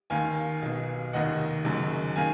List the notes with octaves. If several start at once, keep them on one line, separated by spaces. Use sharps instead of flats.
D#2 D#3 F5 G#5
B1 B2
F1 D#2 D#3 D#5 F#5
F#1 F#2 D#3
D#3 F5 G#5